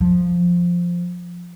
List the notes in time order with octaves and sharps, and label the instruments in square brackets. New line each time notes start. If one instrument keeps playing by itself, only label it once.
[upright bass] F3